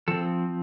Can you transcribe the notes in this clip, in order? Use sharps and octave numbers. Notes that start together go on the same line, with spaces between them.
F3 C4 A4